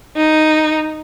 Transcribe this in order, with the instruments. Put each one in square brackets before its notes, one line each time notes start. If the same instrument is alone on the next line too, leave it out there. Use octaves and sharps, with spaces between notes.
[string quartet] D#4